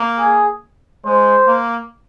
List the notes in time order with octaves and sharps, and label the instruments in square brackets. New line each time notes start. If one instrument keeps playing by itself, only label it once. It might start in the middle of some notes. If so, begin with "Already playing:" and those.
Already playing: [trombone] A#3
[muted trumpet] G#4
[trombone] G#3 [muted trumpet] C5
[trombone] A#3